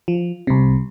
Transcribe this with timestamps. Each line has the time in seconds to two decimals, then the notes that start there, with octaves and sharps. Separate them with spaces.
0.08 F3
0.47 C2 C3